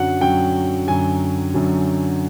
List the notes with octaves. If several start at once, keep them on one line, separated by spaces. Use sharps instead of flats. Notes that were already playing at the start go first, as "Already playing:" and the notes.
Already playing: F#2 D3 F#3 F#5
F#2 D3 F#3 G5
F#2 D3 F#3 G#5
F#2 D3 F#3